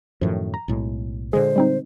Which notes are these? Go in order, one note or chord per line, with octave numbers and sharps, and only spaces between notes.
F#2 A2 D#3 F3
A#5
B1 A2 G#3
A#2 D3 G#3 G#4 C5
G3 C4 D#4